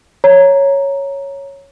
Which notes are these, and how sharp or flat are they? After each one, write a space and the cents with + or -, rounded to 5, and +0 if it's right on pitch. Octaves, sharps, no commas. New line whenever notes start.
C#5 +0 A#5 +0